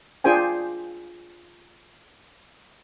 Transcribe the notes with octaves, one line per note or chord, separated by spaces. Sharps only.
D4 F4 G#4 C5 G5 G#5